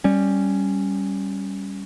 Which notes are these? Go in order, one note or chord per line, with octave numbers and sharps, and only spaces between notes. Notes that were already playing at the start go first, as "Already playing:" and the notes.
G3 C#4